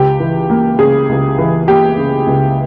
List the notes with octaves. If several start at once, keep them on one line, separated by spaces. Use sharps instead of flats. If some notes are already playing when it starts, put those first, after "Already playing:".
Already playing: C#2 G4
E3
A#3
C#3 G#4
C#2
E3
A#3 G4
C#3
C#2